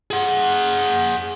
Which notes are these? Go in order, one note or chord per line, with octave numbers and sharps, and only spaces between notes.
G#4 F#5